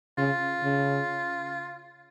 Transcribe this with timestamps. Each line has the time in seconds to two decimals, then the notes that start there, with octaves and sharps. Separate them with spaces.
0.18 C#3 F4
0.63 C#3